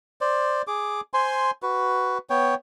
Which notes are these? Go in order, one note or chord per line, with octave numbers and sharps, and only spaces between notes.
C5 D5
G#4 D6
C5 G#5 C6
F#4 B4
B3 C#5 G5